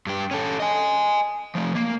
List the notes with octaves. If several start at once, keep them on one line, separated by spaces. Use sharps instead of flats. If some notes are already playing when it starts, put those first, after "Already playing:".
G2 G4
C#4 A4
D#5 G#5
F3 A3
A#3